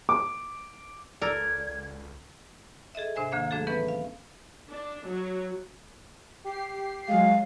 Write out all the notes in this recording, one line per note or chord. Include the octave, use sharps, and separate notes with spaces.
D6
C#2 A4 A#4 D5 G#6
G#4 A4 D#5 E5
G#2 C3 D4 C5 E5 G#5
D2 D#3 A#3 D4 F5 G#6
F#3 A3 D4 F#4 G#4 A4
E3 B3 C#4 A4 B4 E5
F5
D4
F#3
G4 C7
F#3 G#3 F5